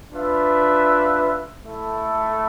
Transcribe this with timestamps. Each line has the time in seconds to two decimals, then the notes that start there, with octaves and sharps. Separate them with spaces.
0.11 D4 F4 B4 E5
1.65 A3 E4 A4 E5